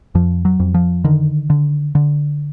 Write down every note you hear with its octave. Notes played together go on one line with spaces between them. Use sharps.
F2 F3
F#3
F2
F3
D3 D#3
D3
D3